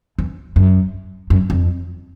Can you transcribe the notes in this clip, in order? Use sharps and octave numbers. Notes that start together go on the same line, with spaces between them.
E2
F#2
F#2
F2